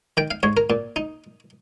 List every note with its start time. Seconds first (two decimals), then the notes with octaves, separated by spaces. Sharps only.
0.17 D#3 G5
0.31 F5
0.43 G#2 C#5
0.57 A#4
0.70 A#2
0.96 D#4